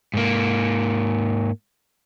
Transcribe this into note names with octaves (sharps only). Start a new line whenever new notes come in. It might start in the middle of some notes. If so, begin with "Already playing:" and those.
G#2 A#3